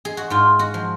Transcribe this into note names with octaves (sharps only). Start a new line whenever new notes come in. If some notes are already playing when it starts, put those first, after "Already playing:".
G#4
F#4
G#2 F4
F#4
F3